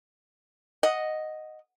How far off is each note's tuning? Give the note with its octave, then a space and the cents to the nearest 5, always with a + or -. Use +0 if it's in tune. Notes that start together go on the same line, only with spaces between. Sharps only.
D#5 +0 F#5 +0